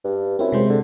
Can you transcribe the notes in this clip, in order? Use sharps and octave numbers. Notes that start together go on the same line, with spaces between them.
G2
F#2 C4 E4
C3 G#3 C5
D3